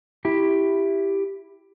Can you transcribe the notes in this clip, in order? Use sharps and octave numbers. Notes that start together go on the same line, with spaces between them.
E4 G4